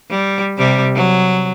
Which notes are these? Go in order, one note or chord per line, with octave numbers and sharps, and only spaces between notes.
G3
C3 G3
F#3